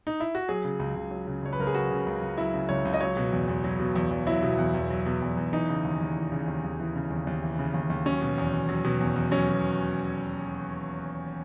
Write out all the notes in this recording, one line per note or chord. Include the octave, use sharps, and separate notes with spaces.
D#4
E4
F#4
F#3 G#4
C#3
C#2
C#2
F#3
C#3
C#2 C#5
B4
C#2 A#4
G#4
F#3 F#4
C#3
C#2
C#2
F#3 E4
C#3
C#2 C#5
C#2
D#5
F#3 C#5
B2
E2
E2
F#3
B2
E2
E2
F#3 E4
B2
E2
E2
F#3
B2
E2
E2
E3 D#4
C#3
D#2
D#2
E3
C#3
D#2
D#2
E3
C#3
D#2
D#2
E3
C#3
D#2
D#2
F#3 C#4
B2
E2
E2
F#3
B2
E2
E2
F#3 C#4
B2